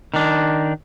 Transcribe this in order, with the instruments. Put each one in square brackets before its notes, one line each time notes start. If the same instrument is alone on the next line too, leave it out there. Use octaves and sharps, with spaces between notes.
[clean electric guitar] D#3 D4